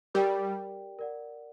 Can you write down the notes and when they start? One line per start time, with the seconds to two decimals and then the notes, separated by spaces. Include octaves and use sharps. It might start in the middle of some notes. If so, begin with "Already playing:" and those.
0.14 G3 G4 A#4 D5 G5
0.99 A#4 D5 F#5